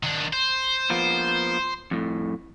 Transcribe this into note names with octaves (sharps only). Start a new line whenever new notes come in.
D#3 D4
C5
F3 A#3 B3
F2 A2